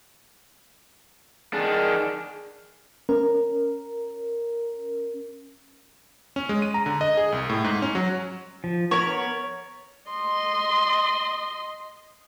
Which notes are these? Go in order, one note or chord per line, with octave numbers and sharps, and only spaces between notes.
D#3 D4 G#4
C#4 A#4
C#4
G#3
D#7
A#5
D3
D#5
G#4
C2
A2
G#2
C#4
F#3
F3
B3 A#4 C#5 B5
D#5 C6